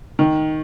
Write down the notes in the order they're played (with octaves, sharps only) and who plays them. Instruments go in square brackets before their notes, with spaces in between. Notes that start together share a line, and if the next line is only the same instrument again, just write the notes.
[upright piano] D#3